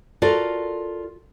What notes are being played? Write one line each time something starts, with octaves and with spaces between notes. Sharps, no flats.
F4 F#4 A4 A#4 D5